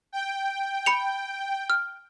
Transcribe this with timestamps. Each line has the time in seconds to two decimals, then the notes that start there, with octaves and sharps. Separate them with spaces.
0.12 G5
0.86 B5 C#7 F7
1.70 F6